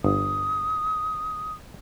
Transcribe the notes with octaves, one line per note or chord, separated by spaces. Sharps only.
G1 D#6